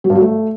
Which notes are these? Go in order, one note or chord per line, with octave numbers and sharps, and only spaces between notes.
F#3
G2
F#3
A3